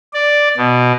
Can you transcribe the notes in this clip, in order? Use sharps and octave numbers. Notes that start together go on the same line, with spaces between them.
D5
B2